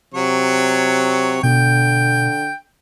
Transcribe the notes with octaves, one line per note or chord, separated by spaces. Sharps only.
C3 F#3 C#5
B2 D3 G5